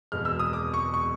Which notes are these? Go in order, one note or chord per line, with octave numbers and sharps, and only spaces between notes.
E1 E2 B2 G#3 B3 F6
E6
D#6
D6
C#6
C#6